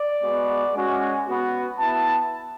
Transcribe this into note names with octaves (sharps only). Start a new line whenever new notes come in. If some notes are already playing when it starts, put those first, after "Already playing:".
Already playing: D5
G#3 B3 F#4
G#3 C#4 F#4
B3 F#4
B3 E4 A5